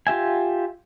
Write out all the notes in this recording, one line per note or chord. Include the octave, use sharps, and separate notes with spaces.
F4 G4 E5 G#5